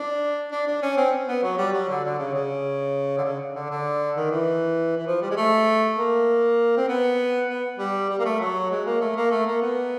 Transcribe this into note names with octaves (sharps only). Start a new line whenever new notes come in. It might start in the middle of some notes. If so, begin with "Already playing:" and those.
Already playing: D4
D4
D4
C#4
C4
B3
F#3
G3
F#3
D3
D3
C#3
C#3
D3
C#3
D3
D3
D#3
E3
E3
F3
G3
G#3
A3
A#3
C4
B3
B3
G3
G3
A#3
A3
F#3
G#3
A#3
A3
A#3
A3
A#3
B3